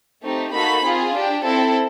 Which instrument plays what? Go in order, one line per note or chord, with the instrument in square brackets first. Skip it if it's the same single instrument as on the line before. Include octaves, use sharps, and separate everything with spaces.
[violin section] A3 C4 D#4 G4
A#3 D#4 F#4 A4 B5
C4 F4 G#4
D4 G4
C4 E4 A4